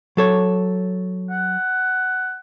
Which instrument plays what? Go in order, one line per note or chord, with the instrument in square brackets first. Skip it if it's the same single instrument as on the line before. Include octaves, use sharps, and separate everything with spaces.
[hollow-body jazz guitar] F#3 A4 C#5
[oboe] F#5